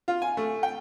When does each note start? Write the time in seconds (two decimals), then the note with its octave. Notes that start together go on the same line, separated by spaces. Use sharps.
0.08 F4
0.22 G#5
0.37 A3
0.63 G5